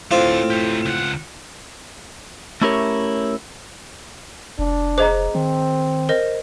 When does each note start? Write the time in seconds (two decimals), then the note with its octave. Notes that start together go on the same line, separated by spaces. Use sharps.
0.11 A2 A3 C4 D4 F4
0.50 A3 G4
0.85 C#2 F#5
2.62 A3 C#4 E4 G4 A#4 C#5
4.59 F1 D4
4.98 G#4 C5 D#5 A#5 D6
5.35 D#3 C4
6.09 A#4 C5 D#5